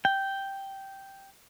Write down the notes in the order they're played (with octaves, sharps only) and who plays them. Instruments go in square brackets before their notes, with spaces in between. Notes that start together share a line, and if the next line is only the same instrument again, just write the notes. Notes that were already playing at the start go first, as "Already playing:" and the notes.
[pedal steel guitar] G5